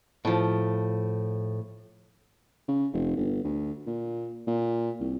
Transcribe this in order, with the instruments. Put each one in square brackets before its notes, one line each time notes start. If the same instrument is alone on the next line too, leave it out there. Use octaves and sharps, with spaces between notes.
[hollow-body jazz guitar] A2 F3
[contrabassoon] C#3
F1
G1
D2
A#2
A#2
C2